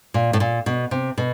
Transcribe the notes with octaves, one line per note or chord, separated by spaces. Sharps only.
A#2
A2
A#2
B2
C3
B2